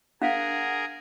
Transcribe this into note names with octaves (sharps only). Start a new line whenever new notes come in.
D4 G#4 A#4 F5 F#5